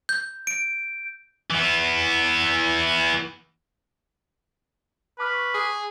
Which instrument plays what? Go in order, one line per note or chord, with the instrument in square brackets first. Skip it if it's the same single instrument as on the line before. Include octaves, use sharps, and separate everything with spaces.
[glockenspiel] G6
D7
[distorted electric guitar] E3 B3
[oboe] B4 [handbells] A5 D6 F6
[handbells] C#6
[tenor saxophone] G#4